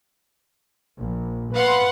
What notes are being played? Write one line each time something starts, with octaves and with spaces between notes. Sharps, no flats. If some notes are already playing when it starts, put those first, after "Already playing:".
A#1
B4 F5 F#5 C6